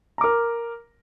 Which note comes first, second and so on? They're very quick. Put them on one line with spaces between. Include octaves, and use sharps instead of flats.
A#5 D6 A#4